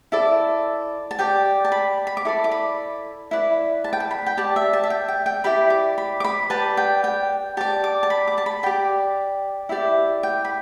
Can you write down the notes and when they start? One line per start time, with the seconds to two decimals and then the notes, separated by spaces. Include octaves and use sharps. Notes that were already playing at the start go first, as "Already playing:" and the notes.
0.12 E4 A4 D5
1.11 A5
1.19 G4 D5 G5
1.65 A5
1.72 B5
2.07 B5
2.17 D6
2.25 E4 A4 D5 B5
2.44 D6
2.51 B5
3.31 E4 B4 D5
3.84 A5
3.93 G5
4.00 A5
4.11 B5
4.26 G5
4.37 G4 D5 A5
4.56 E5
4.73 A5
4.84 E5
4.90 G5
5.08 G5
5.26 G5
5.44 E4 G4 D5 B5
5.70 D6
5.98 B5
6.20 D6
6.25 B5
6.50 G4 B4 D5 A5
6.77 G5
7.04 G5
7.57 G4 D5 A5
7.84 D6
8.03 A5
8.10 B5
8.28 D6
8.38 A5
8.46 B5
8.63 G4 D5 G5
9.69 E4 G4 D5 E5
10.23 G5
10.45 B5